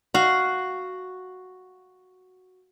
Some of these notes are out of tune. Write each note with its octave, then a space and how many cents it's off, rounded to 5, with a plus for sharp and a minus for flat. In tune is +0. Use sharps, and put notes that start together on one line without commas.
F#4 +0 F5 -5